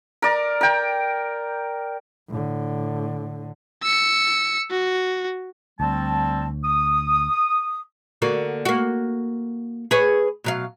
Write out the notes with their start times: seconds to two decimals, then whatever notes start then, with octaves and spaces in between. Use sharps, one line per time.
0.22 A#4 D5
0.61 A#4 G5
2.28 A2 D3
3.83 E6 C#7
4.71 F#4
5.80 D2 G3 C4 A5
6.64 D#6
8.22 D3 A#3 F#4
8.65 A#3 F#4
9.91 G#4 B4 C#5
10.44 B2 F#3 F5